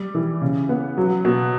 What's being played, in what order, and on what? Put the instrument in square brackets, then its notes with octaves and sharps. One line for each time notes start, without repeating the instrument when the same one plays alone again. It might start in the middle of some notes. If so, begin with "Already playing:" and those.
Already playing: [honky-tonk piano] G3
E3
C#3
B3
F#3
B2